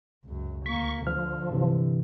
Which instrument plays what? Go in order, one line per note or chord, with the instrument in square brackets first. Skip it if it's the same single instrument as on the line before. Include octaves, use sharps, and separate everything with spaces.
[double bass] C#2 F#2
[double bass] D2 A#3 [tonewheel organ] C#6 [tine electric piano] B6
[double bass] D3 [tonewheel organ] F3 [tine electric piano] F6
[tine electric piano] G2 C3 E3